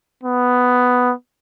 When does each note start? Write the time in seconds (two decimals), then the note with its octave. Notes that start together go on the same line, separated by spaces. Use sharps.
0.23 B3